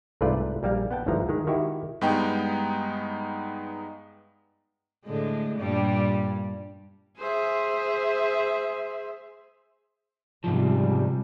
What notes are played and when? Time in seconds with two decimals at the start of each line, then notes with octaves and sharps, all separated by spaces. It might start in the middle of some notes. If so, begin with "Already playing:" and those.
0.21 C2 G#2 A3 F4 B4 D5
0.63 A#1 G3 A#3 F5
0.91 B3 F#5 G5 A5
1.06 G1 D2 G#2 E3 F3 A#5
1.29 D#3 G#3
1.47 D#3 E4 F#4 G4
2.01 G2 G#3 B3 D#4 G5
5.06 A2 D3 G#3
5.58 G2 A#2 G3
7.18 G#4 C5 E5
10.44 G#2 C3 F3 G3